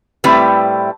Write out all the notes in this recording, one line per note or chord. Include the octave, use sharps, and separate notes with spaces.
A2 G3 A3 C4 E4 B4